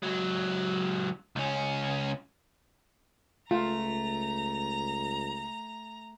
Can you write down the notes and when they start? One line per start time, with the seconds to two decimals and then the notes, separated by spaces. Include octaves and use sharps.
0.03 C#2 F#3
1.36 C#2 C#4
3.51 C#2 A3 F4 A#5